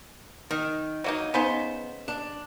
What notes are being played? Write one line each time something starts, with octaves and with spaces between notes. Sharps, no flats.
D#3
F#3 A#3 D#4
C#3 B3 D#4 C5
D4